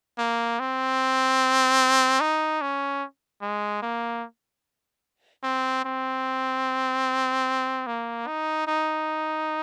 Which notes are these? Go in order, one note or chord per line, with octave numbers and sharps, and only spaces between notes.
A#3
C4
D#4
C#4
G#3
A#3
C4
C4
A#3
D#4
D#4